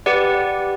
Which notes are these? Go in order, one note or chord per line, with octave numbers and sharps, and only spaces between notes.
G4 B4 D5 F#5